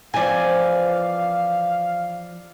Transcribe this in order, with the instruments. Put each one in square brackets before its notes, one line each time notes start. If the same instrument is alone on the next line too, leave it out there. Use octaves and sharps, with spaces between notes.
[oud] E3 F3 C4 [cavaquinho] D5 G#5 [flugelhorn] F5